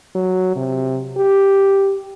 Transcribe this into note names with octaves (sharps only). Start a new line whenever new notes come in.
F#3
C3
G4